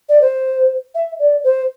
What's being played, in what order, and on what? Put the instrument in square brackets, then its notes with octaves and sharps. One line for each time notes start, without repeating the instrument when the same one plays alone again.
[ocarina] D5
C5
E5
D5
C5